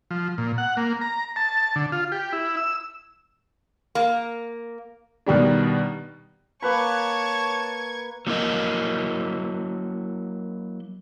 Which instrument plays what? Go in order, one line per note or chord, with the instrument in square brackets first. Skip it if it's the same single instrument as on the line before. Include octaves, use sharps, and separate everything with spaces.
[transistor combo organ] F3
A#2
F#5
A#3
A#5
A5
D3
F4
G4
E4
E6
[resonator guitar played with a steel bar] A#3
[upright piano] B2 D#3 G3 D4
[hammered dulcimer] A#3 B4 B5 [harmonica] C#5 A5 [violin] C#6 G#6
[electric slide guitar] F#3 A#3 E4 A#4 D#5